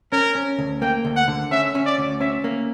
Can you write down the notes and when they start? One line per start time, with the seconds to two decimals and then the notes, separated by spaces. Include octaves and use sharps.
0.12 C#4 A#4
0.35 C#4
0.59 D2
0.82 A#3 G5
1.05 D2
1.16 F#5
1.28 D3
1.51 C#4 E5
1.75 C#4
1.86 D5
1.98 D2
2.20 C#4 E5
2.44 A#3